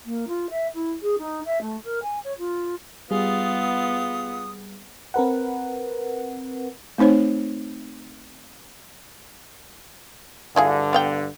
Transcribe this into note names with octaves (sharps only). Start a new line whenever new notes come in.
A#3
F4
E5
E4
G#4
D#4
E5
A3
A#4
G#5
C#5
F4
G3 B3 F4 G#4 D#6
C4 A#4 B4 F#5
A3 C4 D#4 C5 C#5
G2 D3 E4 F4 G#4
B3 F5 G5